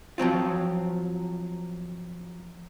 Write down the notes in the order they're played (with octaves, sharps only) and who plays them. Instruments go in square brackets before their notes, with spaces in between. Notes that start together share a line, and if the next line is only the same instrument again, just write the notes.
[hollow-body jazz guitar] F3 F#3 C4 F4